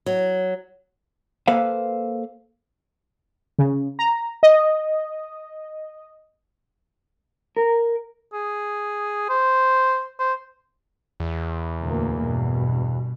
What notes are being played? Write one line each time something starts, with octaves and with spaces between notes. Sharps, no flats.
F#3
A#3 A4 B4 C5 F5
C#3
A#5
D#5
A#4
G#4
C5
C5
E2
D2 A#2 A#3
G2 B2